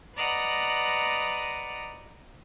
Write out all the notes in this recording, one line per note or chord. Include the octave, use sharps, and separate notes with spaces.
B4 D5 D#5 F#5 A#5